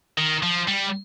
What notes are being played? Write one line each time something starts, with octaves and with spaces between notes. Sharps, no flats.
D#3
F3
G3